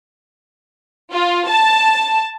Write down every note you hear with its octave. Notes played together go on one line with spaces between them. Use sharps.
F4
A5